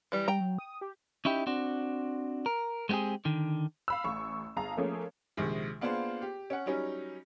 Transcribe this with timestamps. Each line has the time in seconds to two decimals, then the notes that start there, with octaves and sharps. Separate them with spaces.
0.12 E3 G3
0.28 G3 G5 A#5
0.40 F#3
0.59 D#6
0.81 G4
1.25 C#4 D#4 E4 G4
1.47 C4 D4 F#4
2.46 A#4
2.89 G#3 B3 C4 G4 G#4
3.25 D3 D#3
3.88 F5 B5 E6
4.04 A1 C#6
4.56 G1 G#4 F5 A5 A#5
4.77 F3 A3 A#3 C#4 G#4
5.37 A#1 C3 D#3 G#3
5.81 A#3 B3 D4 F4 G#4 C5
6.22 G4
6.50 C#4 F#5
6.66 F#3 G3 C#4 D#4